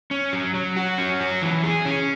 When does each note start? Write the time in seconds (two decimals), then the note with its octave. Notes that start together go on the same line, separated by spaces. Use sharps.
0.11 C#4
0.33 F#3
0.55 F#3
0.77 F#4
0.98 C#4
1.20 F#3
1.42 E3
1.64 G#4
1.85 C#4